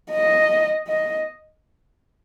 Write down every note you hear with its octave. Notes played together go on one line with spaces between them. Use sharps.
D#5
D#5